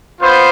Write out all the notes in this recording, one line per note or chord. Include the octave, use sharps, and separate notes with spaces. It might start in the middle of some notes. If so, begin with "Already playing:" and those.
B3 F4 C5